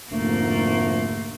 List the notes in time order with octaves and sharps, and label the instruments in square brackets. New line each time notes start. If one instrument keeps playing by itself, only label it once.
[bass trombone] F1 [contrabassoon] D2 [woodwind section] G#2 A3 [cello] A#3